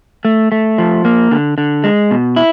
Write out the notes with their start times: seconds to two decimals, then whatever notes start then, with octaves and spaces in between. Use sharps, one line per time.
0.25 A3
0.52 A3
0.78 F3
1.05 A#3
1.31 D3
1.58 D3
1.84 G#3
2.11 B2
2.36 E4